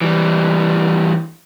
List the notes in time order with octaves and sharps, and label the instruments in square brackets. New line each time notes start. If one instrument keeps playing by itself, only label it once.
[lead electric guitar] E3 G3